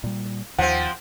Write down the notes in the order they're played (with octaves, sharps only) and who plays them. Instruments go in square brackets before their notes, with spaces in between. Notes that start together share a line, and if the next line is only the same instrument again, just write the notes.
[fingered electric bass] A#2 G3
[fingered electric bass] D#2 [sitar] F3 C4 [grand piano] F#5